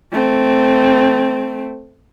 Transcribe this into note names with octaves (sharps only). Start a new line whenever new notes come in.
A3 C4